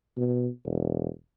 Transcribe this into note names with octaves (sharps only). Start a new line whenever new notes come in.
B2
E1